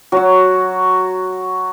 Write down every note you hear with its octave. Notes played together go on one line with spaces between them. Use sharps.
F#3 F#4